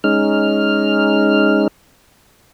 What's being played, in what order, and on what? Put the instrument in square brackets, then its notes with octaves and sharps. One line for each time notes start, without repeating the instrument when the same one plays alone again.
[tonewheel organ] G#3 C#4 D#4 F6